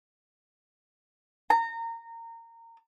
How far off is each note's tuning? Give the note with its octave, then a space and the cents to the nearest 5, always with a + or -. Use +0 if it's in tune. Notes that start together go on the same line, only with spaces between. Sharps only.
A#5 -25